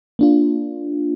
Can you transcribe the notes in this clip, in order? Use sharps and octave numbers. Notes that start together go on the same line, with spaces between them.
A#3 D4 F4